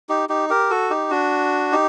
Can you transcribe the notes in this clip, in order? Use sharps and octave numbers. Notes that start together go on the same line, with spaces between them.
D#4 G4
D#4 G4
G4 A#4
F#4 A4
D#4 G4
D4 F#4
D#4 G4